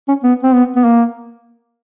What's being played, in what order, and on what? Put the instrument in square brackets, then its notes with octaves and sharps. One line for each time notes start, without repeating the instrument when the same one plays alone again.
[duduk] C#4
B3
C4
B3
B3
A#3